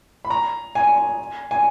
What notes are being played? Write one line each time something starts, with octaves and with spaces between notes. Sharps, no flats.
B5
A#5
G#5
G#5